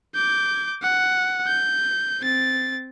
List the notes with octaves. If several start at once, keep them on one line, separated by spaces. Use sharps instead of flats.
D6 G6
F#5
G6
C4 A6